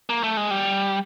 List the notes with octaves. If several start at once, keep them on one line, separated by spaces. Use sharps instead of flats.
A#3
A3
G#3
G3